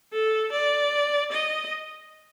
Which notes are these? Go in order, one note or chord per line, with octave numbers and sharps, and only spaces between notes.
A4
D5
D#5